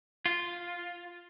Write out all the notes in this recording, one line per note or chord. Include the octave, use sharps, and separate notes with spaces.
F4